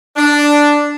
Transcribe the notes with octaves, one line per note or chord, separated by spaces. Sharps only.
D4